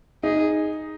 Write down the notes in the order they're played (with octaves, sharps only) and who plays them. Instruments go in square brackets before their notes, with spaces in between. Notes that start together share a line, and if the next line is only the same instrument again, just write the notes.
[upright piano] D#4 [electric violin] G#4